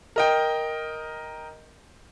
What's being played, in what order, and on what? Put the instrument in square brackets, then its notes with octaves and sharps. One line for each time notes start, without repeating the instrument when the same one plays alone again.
[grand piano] A#4 D#5 G5